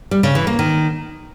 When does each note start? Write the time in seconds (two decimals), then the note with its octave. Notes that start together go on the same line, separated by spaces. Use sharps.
0.11 G3
0.23 C#3
0.35 E3
0.47 A#3
0.59 D#3